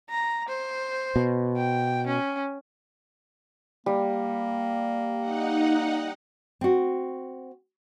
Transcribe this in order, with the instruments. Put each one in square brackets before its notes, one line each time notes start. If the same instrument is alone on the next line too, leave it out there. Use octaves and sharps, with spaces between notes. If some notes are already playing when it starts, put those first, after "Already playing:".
[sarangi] A#5
C5
[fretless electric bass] B2
[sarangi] G5
C#4
[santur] G3 [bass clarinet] A#3
[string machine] D#4 F#5
[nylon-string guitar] C4 F#4